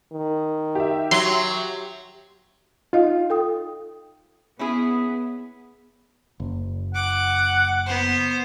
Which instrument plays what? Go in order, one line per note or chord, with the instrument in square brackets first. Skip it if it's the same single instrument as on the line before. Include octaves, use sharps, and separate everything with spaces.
[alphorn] D#3
[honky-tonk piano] G4 E5
[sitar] F#3 [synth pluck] C6
[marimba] D#4 D#5 F5 [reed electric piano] F4
[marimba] A4 G5 D#6
[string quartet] B3 [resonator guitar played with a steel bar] C#4 E4 G#4
[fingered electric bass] F#1
[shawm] F#5 [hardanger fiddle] D6
[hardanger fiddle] B3 C5